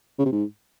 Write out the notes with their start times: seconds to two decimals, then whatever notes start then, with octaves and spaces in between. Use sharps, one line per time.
0.19 C#3
0.25 C3
0.32 G#2